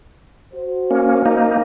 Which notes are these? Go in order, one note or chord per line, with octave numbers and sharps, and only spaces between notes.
F#4 C5
A#3 C#4
A#3 D#4